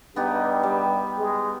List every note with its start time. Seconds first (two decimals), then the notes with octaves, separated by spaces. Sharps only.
0.16 G2 B3 D#4 G4
0.63 G3
1.18 G#3